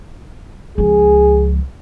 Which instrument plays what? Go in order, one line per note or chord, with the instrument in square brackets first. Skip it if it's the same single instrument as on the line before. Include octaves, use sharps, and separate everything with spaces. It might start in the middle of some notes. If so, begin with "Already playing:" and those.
[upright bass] C#2 F3 [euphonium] G#4